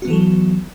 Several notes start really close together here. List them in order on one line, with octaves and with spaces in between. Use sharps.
F#4 B3 E3 A4 F#3